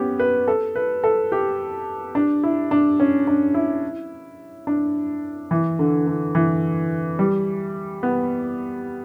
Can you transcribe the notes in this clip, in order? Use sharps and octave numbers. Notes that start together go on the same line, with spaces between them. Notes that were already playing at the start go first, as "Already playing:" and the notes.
Already playing: B3 C#4 G4
B4
A4
B4
A4
G4
D4
E4
D4
C#4
D4
E4
D4
E3
D3
D3
E3
G3
B3